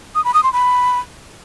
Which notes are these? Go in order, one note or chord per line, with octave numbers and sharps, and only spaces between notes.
D#6
B5
D#6
C6
B5